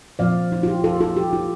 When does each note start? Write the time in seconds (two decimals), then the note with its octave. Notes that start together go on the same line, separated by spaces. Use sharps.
0.19 A#2 F3 C4 F4 D5 F5
0.52 F4
0.63 F4
0.68 G4
0.84 F4 A4
1.00 F4 A4
1.17 G4
1.33 F4